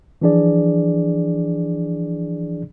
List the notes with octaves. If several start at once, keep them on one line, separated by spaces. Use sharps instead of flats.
E3 F3 D4 G#4 D5